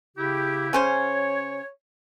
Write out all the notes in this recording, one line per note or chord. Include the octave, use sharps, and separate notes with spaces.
C#3 E4 G4
C#3 C#4 C5 C#5